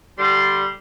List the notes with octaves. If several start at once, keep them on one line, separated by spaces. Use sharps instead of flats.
D3 G3 C6